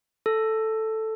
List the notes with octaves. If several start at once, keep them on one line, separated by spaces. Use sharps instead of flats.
A4